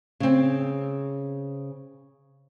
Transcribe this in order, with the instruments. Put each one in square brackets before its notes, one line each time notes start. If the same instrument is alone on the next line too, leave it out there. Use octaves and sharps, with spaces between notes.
[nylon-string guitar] C#3 C4